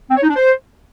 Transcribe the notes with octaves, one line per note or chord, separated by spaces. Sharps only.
C4
C#5
D#4
D4
C5